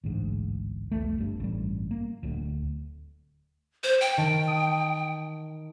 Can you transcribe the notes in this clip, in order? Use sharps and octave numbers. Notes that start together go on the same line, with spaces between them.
A1 D2 G#2
F1 C2 A3
G1 G2
A1 G2 G3
A#3
D1 D2
C5 E7
G5
D#3 A5
D#6